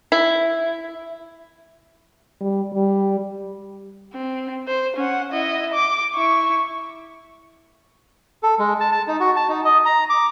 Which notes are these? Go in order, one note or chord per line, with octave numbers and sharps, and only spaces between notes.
E4
G3
G3
C4
C5
C#4 F#5
E4 D#5
D6
E4 C#6
A4
G#3
A5
A5
D#4
F#4
A5
D#4
D#5
A#5
D6